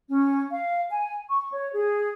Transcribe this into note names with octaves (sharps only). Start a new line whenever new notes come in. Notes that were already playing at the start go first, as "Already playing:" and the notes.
C#4
F5
G#5
C#6
C#5
G#4